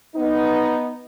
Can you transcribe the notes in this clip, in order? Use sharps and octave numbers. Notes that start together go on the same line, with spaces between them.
B3 D#4